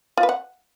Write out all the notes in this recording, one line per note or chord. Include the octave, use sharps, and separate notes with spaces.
F4
B4
F#5